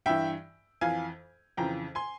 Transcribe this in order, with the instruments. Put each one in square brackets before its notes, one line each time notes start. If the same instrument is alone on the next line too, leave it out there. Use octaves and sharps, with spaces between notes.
[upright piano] G2 E3 E5 G5
F2 E3 F5 G#5
F2 C#3 E3 G5 A#5
G#5 C6